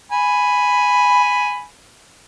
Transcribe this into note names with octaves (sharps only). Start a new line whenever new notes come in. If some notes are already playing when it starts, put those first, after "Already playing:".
G#5 B5